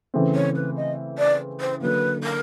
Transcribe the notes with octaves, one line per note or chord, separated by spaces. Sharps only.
C#3 E3 A3 C4
C#5
B4
D#5
D5
C5
D3 F#3 A#3 B4
A#4